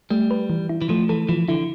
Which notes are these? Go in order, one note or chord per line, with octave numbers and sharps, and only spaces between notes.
G3 A3
B4
E3
E4
E3
F3 A3
E3 A4
E3 F3
D3 E4